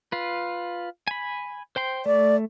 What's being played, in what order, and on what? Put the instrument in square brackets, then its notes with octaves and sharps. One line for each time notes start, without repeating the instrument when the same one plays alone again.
[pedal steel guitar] F4 B4
G#5 B5
C5 G5 C6
[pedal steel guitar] A3 [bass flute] D5